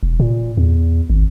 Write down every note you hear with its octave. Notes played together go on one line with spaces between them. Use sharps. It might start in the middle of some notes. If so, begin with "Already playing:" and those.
E1
A#2
E2
G#1